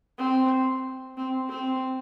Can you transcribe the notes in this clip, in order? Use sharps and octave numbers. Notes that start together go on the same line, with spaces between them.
C4
C4
C4